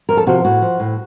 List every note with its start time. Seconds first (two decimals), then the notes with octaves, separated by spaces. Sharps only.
0.09 F2 A#4
0.17 A4
0.27 C3 F3 F#4
0.45 A2 F#4
0.62 F3
0.80 A2